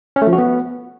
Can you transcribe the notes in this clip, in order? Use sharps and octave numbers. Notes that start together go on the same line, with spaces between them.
C#4
A3
F3
F#4
B3